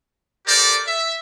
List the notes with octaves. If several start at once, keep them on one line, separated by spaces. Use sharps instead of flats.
G4 A4 A#4 C5 D5
E5